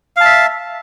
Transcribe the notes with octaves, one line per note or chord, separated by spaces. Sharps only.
E5 F5 A5